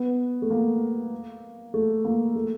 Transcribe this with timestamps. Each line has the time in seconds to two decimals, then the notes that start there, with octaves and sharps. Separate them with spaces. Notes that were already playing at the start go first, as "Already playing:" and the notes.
Already playing: B3
0.42 A3
0.50 A#3
1.74 A3
2.04 A#3
2.35 A3